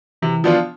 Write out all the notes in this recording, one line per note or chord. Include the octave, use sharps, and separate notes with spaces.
C3 E3
F3 B3 D4 F4